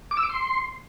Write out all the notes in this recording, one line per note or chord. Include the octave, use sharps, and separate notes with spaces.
D6
E6
D6
C6